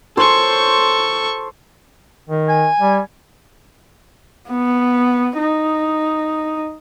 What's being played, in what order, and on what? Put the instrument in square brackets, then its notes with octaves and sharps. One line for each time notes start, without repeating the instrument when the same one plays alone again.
[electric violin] A4 C#6 [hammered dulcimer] C5 C#5
[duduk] D#3
[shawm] G#5
[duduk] G3
[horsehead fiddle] B3
D#4